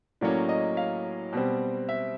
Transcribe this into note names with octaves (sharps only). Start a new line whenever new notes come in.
A2 F#3 A#3 C#4 D5
D#5
F5
B2 G3 C4
E5